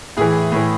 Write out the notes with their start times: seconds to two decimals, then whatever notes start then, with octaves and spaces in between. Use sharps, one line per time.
0.17 A2 E3 G#4
0.52 A2 E3